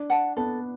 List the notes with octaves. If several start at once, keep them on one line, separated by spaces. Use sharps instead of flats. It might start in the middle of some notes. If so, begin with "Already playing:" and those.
Already playing: D4
F#5 A5
B3 A4